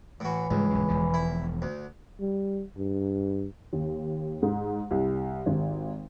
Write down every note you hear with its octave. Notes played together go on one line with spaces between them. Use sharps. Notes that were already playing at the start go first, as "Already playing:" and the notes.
A2 E3 F#4
C#2 G#2 C#3 G3
A#1 F#2
E1 E2 F3
E4
D2
G3
G2
D#2
G#2
C2
G#1